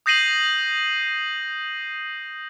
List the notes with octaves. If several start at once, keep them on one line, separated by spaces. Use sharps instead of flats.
D#6 G6 A#6 C7 D#7 F#7